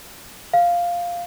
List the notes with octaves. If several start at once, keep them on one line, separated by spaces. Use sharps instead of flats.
F5